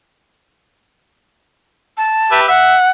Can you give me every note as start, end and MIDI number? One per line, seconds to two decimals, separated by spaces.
1.97 2.40 81
2.31 2.46 67
2.31 2.46 71
2.31 2.46 76
2.48 2.75 76
2.48 2.90 78